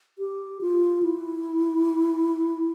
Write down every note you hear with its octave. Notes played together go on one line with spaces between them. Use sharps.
G4
F4
E4